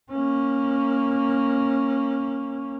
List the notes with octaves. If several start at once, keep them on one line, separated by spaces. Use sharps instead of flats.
A#3 C#4